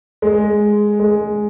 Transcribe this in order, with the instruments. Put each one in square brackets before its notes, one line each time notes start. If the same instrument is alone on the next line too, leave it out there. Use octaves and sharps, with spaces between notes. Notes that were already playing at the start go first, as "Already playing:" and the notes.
[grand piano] G#3
G#3